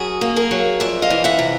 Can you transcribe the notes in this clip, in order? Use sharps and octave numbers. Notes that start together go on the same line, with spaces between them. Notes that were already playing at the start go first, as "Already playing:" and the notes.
Already playing: F#2 F#4 G#4
A#3
G#4 A#4
F#3
F2 D5 E5
D#5 F5
E3
E5 F#5
C3